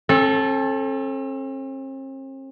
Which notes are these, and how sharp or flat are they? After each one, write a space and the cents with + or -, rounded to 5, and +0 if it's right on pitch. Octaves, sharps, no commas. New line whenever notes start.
C4 +45 A4 -10